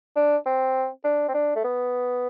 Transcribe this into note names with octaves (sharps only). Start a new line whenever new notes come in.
D4
C4
D4
C4
D4
A3
B3